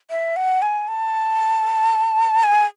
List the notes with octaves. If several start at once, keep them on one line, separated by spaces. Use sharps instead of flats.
E5
F#5
G#5
A5
G#5